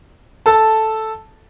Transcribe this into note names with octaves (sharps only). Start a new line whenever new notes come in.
A4 A5